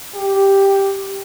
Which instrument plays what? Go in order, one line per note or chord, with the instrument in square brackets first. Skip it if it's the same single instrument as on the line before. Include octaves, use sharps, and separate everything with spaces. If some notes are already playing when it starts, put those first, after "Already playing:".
[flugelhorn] G4